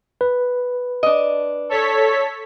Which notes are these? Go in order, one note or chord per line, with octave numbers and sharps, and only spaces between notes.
B4
D4 D#5
A4 C#5 B6